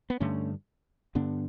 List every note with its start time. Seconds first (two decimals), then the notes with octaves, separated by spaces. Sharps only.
0.10 B3
0.20 G2 D3 A3 C#4
1.15 G2 D3 B3 D4